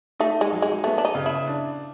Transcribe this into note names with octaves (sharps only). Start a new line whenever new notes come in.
A3 D#4
G#3
F#3
G#3
A3 B3
D4
D#4
C#3
E4
D4